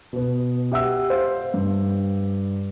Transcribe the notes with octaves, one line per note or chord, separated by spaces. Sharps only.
B2 B3
G4 E5 F#5 E6
C5 F5
G2